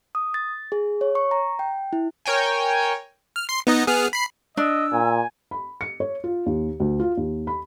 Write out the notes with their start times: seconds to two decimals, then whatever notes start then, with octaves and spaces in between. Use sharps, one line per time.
0.15 D#6
0.34 A6
0.72 G#4
1.01 C#5
1.15 C#6
1.31 A#5
1.59 G5
1.93 E4
2.25 A#4 C#5 G5 G#5
3.36 F6
3.49 C6 C7
3.67 B3 D#4 D#5
3.87 B3 G#4 F6
4.13 B5 C7
4.57 D4 D#5 E6
4.93 A#2 G#5
5.51 B5
5.81 C#7
6.00 C#5
6.24 F4
6.46 D#2
6.80 D2
7.00 F4
7.17 D#2
7.47 B5